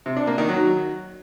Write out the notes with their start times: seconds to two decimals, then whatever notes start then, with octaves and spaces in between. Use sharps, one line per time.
0.06 C3
0.17 D4
0.27 A#3
0.38 D#3
0.49 F#3